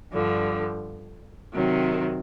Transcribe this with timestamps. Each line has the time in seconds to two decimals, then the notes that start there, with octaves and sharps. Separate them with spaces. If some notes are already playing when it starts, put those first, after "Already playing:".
0.12 G2 D3 F3
1.53 C3 D#3 F#3